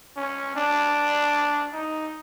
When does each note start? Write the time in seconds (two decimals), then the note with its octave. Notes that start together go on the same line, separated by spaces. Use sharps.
0.17 C#4
0.56 D4
1.73 D#4